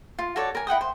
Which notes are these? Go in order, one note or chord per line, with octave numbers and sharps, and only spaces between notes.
F4
F#4 A4 C#5 D5
A#4 G#5
E4 F#5 G5 D#6
C5